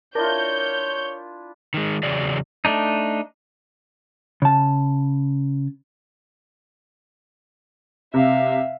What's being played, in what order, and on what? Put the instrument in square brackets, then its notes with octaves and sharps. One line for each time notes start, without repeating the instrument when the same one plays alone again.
[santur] D4 E4 F4 [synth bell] A#4 [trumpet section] C#5 [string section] G6
[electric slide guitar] D#3 G#3
E2 C#3 F#3 G#4 D5
[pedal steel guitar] A3 D4 D#4
[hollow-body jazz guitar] C#3 A5
[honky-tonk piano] C3 [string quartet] E5 F5